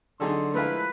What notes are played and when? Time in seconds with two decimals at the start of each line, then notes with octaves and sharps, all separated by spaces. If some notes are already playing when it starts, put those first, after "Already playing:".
0.20 D3 F#3 D#4 G#4 A4 C6
0.54 F3 G#3 A3 E4 A#4 B4 F5